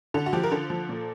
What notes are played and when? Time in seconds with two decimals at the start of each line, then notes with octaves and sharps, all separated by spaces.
0.14 D3 A4
0.26 F#4
0.33 F3 G4
0.43 A#4
0.51 D3 A4
0.70 F3
0.89 A#2